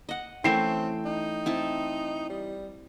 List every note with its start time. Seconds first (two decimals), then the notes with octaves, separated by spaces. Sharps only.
0.09 D#5 F#5
0.44 E3 A3 C4 C#4 G5 C7 E7
1.05 D#4
1.46 C4 E4 A5
2.30 G3